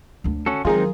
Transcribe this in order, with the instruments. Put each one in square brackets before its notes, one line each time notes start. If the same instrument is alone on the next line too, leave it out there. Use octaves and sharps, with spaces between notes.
[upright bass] D2 D3
[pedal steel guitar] C#4 F#4 A4
[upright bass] D#3 F#3 [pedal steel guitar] G#3 C4 D#4 [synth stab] F4 G#4 A#4